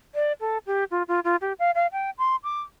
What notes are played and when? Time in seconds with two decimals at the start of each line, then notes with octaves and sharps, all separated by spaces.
0.15 D5
0.40 A4
0.67 G4
0.91 F4
1.08 F4
1.24 F4
1.41 G4
1.59 F5
1.75 F5
1.93 G5
2.18 C6
2.44 D6